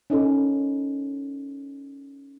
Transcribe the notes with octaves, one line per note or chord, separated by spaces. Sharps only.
C#4 D#4 A4